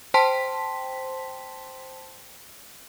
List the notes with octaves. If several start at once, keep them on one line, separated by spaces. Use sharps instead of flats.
C5 G5 A5 C6 B6